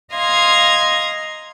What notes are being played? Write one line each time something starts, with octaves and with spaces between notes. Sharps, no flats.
D#5 F5 A#5 C6 G#6